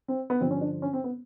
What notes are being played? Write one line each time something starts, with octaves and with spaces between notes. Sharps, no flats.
C4
B3
G2 D3 F3 C4
C#4
D4
C#4
C4
B3